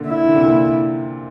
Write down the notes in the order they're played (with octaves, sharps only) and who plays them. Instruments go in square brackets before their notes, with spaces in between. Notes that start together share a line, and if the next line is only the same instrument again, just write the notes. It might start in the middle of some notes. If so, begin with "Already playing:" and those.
Already playing: [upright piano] A#2 D3
[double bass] E4
[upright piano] D3
C3
A#2